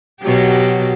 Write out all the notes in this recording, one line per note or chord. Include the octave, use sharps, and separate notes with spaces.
B2 F#3 G4